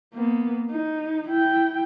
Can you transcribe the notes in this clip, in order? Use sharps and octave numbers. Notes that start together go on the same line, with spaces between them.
A#3 B3
D#4
E4 G5